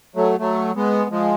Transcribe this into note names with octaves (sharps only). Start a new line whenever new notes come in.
F#3 A3
F#3 A3
G#3 B3
F3 G#3